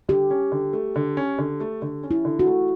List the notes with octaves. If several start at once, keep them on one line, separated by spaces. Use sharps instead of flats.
D3 G4
C#4
D3
A3
D3
C#4
D3
A3
D3
C#4
E4
D3
F#4
A3